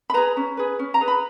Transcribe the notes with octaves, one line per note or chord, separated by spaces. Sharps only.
B5
G#4 B4 A#5
C#4
G#4 B4
C#4
A#5
G#4 B4
B5